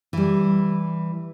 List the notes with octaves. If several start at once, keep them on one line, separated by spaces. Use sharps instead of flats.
E3 G3